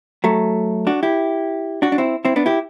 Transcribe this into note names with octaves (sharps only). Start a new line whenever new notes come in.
F#3 A3
D4 F#4
E4 G4
D4 F#4
D4
C4 E4
C4 E4
B3 D4
E4 G4